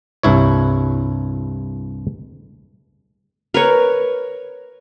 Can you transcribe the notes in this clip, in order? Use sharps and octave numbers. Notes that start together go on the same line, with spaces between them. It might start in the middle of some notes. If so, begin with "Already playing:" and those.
C2 G2 E4 C#5
A#4 B4 C#5